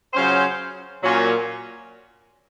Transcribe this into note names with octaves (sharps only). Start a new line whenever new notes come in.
C#3 F#3 C#4 F4 C5
A#2 F#3 C#4